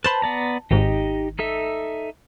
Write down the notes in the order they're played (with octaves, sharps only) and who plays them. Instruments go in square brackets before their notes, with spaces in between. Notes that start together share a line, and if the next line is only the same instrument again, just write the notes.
[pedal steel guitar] B4 C5 B5 [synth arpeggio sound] A5
[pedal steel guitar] B3 D5 A#5
[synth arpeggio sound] G#1 G#2 [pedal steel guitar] D#4 G4 D#5
[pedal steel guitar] D#4 A4 E5